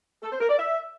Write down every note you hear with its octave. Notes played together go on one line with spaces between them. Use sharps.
A4
C5
A#4
D5
E5